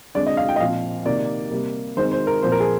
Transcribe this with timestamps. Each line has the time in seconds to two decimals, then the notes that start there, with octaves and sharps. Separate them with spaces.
0.15 D3 G#3 C4 D5
0.26 D#5
0.37 F5
0.48 G5
0.56 D#5
0.60 A#2 F3 C4 F5
1.05 C3 D#3 A#3 D5
1.51 C3 G3 A#3
1.97 D#3 G#3 C4 C5
2.12 C5
2.27 A#4
2.42 A#2 F3 C4 C5
2.52 A#4
2.60 G#4